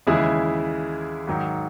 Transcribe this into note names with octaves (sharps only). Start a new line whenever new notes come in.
D#2 C#3 E3 G#3 E4 G#4
G#2 D#3 F#3